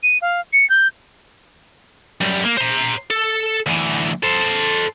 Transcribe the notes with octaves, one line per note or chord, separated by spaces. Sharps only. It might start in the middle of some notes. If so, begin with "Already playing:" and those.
D#7
F5
C#7
G6
F#2 G3
A#3
C5 A#5
A4
D2 E3
A4 C5